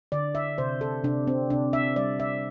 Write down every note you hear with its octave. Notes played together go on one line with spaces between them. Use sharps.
D3 D5
E5
C3 C5
A4
C3 D4
C4
C3 D4
E5
G3 D5
E5